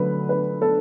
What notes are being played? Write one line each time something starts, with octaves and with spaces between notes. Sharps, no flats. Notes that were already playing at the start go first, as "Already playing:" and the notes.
Already playing: D2 D3 F#3 A3 B4
B4
A4